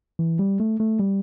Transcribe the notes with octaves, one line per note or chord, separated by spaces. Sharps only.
E3
G3
A3
A3
G3